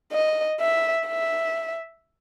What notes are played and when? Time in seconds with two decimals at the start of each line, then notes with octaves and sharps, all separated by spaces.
0.12 D#5
0.60 E5
1.07 E5